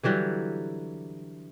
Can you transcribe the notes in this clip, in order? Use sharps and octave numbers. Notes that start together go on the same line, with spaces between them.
D3 E3 F#3 G3